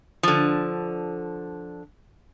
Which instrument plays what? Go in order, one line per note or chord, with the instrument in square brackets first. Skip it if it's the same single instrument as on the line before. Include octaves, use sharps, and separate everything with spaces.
[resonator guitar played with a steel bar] D3 F3